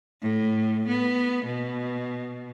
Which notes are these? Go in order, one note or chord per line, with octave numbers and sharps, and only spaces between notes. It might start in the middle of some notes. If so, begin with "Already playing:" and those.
A2
B3
B2